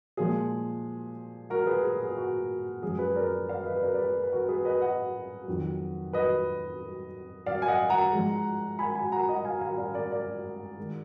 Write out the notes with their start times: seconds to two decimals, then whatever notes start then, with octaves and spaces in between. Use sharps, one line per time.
0.17 A#2 F3 G#3 G#4
1.50 F#4 A#4
1.67 G#4 B4
1.83 G#4
2.00 G#4
2.17 F#4
2.82 F#2 F3 G#3 G#4
2.99 G#4 B4
3.16 A#4 D5
3.49 D5 F5
3.65 B4 D#5
3.76 B4
3.82 A#4 D5
3.94 D5
3.98 G#4 B4
4.24 B4
4.32 F#4 A#4
4.49 G#4 B4
4.65 B4 D#5
4.81 D#5 F#5
5.48 F2 D#3 F#3
6.13 B4 D#5
7.46 D5 F5
7.62 G#5
7.68 D#5 F#5
7.90 F#5 A#5
8.12 G#2 F3 G#3
8.79 G#5 B5
8.95 G#5 B5
9.12 F#5 A#5
9.29 D#5 F#5
9.45 F5 G#5
9.61 F5 G#5
9.78 D5 F5
9.94 A#4 D5
10.11 A#4 D5
10.77 D#3 G#3